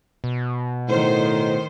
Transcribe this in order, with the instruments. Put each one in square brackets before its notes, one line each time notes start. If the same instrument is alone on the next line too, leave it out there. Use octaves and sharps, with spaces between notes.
[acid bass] B2
[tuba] A2 [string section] D#3 C5